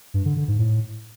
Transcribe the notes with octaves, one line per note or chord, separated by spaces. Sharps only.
G2
D3
D3
G#2
A2